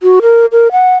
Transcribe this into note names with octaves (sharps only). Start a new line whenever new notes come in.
F#4
A#4
A#4
F#5